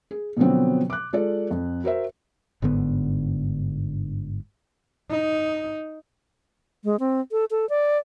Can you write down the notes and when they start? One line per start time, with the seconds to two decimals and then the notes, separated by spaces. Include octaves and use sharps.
0.11 G#4
0.37 B2 D3 F3 F#3 B3 C4
0.90 D6 F#6
1.13 G#3 F4 A4 D5
1.51 F2
1.84 F#4 A#4 C5 E5
2.62 G1 G#2 D3 B3
5.10 D#4
6.84 G#3
7.00 C4
7.32 A4
7.51 A4
7.69 D5